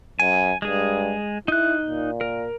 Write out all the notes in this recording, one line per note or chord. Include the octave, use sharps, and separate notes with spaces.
F#2 G#5
G2 G#3 G#4
D#4 E4 F#6
A#2
A#4